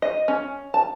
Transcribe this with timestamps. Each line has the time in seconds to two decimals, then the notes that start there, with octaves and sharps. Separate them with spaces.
0.02 D#5
0.28 C#4
0.74 A5